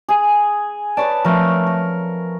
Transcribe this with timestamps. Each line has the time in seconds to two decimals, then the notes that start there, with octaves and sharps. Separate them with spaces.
0.09 G#4 G#5
0.97 B4 C#5 D5 A5
1.25 F3 A3 C4 A#4
1.67 A#4